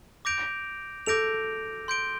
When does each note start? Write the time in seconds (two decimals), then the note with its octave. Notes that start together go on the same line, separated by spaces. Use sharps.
0.25 D6 G6 A#6 D7 F7
1.06 A4 D6 G6 A#6 D7 F7
1.88 C6 G6 D7 G7